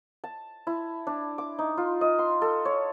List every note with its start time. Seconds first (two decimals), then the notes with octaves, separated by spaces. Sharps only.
0.24 A5
0.67 E4
1.07 D4
1.38 D6
1.59 D#4
1.77 F4
2.01 D#5
2.19 C6
2.42 A4
2.65 C#5